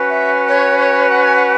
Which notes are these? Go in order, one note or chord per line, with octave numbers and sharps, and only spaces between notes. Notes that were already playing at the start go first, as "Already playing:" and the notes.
Already playing: C#4 F#4 B4
E5
C#5
C#5
F#5
G#5
F#5